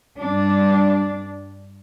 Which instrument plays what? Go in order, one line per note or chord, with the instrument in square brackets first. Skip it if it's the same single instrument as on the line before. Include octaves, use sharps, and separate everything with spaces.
[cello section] G2 D4